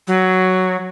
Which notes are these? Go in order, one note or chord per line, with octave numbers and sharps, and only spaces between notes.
F#3